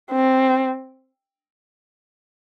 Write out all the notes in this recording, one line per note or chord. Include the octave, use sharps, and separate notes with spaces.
C4